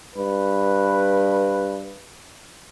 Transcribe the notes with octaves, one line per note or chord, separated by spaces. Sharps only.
G2 B4